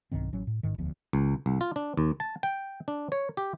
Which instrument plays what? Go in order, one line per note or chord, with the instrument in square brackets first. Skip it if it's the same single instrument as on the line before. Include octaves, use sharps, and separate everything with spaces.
[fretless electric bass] B1 G2 D#3 C4
A1 F#3 C#4
A2
A1 G#2 D#3
E1 D2 F3 B3
[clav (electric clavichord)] C#2
C2
F4
D4
D#2
A5
G5
D4
C#5
G4